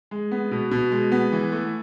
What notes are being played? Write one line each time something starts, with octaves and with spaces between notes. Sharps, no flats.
G#3
B3
B2
B2
G#3
B3
E3
A3